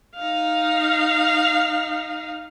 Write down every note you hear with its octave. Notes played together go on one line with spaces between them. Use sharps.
D#4 F5